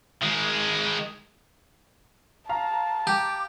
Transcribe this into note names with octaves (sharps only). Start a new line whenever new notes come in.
D#3 G#3
F5 A5 A#5
G4 D6